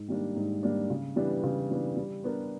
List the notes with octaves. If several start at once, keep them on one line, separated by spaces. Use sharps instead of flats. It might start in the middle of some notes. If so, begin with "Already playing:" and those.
Already playing: G#2
D#3 G3 A#3 D4
G#2
D#3 G3 A#3 D4
C#3
E3 G3 B3 D4
C#3
E3 G3 B3 D4
G3
B3 D4 G4 A#4